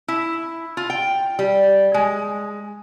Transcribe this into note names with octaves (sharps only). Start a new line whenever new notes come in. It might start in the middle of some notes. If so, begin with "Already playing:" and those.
E4
F4
G5
G3
G#3